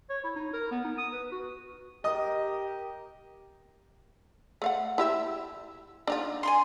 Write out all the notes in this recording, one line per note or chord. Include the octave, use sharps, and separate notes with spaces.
C#5
E4
D#4
A#4
B3
D#4
D#6
B4
F#4
G4 A#4 D#5 D#6
A3 F5 F#5
E4 G4 E5
D4 D#4 F4
G#5 B5 C6